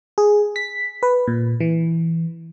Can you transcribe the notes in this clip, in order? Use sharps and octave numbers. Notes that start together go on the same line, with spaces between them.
G#4
B6
B4
A#2
E3